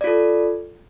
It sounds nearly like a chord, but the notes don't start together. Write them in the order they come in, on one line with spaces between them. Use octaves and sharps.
D5 F4 A4